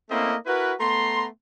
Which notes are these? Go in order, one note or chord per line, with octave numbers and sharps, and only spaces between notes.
A3 A#3 C4 C#4 E4 D#5
E4 F#4 A#4 B4
A3 B3 A#5 C6